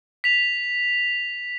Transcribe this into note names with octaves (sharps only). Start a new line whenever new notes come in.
B6 F7